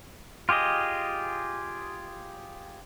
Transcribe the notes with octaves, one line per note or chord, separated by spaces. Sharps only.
F4 G4 G#4 D#5